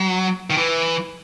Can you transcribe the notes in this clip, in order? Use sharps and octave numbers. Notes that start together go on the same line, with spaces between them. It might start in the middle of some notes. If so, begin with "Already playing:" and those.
Already playing: F#3
D#3
E3